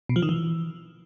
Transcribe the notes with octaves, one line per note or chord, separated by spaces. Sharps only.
B2
F3
D#3
E3